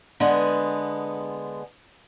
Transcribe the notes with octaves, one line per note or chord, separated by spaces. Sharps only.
D3 G#3 B3 G#4